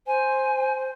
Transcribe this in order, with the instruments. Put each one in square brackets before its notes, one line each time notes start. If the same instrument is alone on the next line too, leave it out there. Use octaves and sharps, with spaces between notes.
[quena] C5 [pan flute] G#5